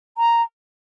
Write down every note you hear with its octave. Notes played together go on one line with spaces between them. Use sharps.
A#5